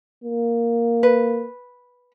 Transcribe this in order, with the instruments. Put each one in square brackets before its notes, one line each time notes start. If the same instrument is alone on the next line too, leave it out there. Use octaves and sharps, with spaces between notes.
[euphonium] A#3
[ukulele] B4